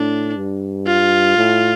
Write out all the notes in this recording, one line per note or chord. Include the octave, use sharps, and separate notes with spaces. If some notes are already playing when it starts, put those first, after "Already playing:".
Already playing: A2 D4
G2
F4
A2